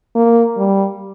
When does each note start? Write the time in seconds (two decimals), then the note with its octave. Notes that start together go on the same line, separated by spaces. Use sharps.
0.15 A#3
0.57 G3